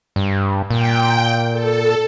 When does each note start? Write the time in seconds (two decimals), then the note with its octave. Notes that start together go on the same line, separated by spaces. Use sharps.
0.16 G2
0.70 A#2 G5
1.52 A4